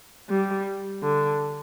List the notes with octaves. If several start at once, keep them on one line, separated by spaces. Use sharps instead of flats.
G3
D3